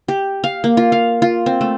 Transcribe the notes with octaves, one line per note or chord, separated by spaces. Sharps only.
G4
F5
A#3
F4
F5
F4
C4
A3